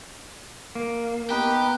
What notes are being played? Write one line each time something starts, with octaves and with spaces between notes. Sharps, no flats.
A#3
B3 D#4 G4 B4